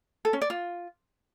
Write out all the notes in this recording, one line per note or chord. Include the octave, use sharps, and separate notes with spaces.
A4
C#4
D5
F4